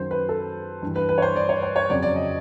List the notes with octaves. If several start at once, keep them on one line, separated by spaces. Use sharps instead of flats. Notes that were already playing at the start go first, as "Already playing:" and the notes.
Already playing: F#2 D#3 F#3 C5
B4
A4
G2 E3
B4
B4
C#5
C5
D5
C#5
C5
C#5
F2 C#3 F#3 D5
D5
D#5